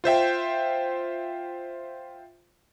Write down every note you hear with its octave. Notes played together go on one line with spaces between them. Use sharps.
F4 C5 E5 G5